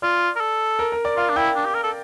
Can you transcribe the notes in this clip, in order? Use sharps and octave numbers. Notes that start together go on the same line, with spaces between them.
F4 D5
A#4
A4
A#4
A#4
D5
F4 F5
D4
E4 G5
D4
G4
A#4
A4